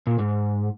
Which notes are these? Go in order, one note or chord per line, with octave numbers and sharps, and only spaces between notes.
A#2
G#2